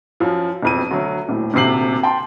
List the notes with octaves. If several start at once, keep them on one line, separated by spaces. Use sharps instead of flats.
F#2 F3
E1 F2 D#7
D2 F#3
D#1 A2
D#1 D2 C3 C7 F#7
G5 A5 C6